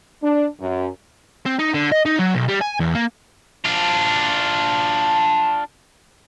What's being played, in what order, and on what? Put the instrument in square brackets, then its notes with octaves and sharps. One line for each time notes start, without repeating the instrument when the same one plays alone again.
[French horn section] D4
F#2
[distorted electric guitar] C4
D#4
D3
D#5
D#4
F#3
B1
G3
G#5
E2
A#3
[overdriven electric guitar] D4 F4